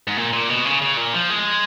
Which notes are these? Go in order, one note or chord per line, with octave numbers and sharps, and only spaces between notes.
G#2
A#2
A#2
B2
C#3
C#3
A#2
F3
G#3